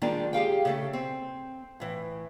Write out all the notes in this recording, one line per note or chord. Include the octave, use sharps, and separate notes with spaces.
D#3 G3 G#3 A#3 D4 F4
G4 G#4 F5 G5
C#3 A3 A4
C4
A2 E3